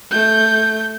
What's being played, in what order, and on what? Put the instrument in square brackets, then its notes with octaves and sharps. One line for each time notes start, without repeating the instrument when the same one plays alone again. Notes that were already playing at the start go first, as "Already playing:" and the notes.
[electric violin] A3 G6